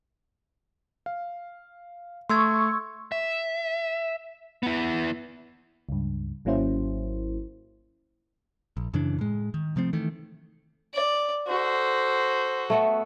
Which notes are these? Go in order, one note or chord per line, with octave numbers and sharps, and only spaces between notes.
F5
A3 C6 C#6 E6 G#6
E5
B3 E4
C#2 G2
G#1 F#3 A#3 C#4 E4 C5
A#1
F#2 C#3 E3 D4
A2 G#3
D#3
C3 F3 A3 C4
D#3 E3 A3
D5
F#4 A4 C5
A3 B3 E5